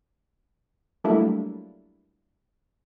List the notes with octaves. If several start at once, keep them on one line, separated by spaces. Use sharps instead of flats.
F#3 G3 A3 A#3 D4 E4